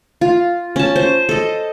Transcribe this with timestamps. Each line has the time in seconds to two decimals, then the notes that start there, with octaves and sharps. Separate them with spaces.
0.21 F4
0.76 C#4 A5
0.96 C5
1.29 A4 D#5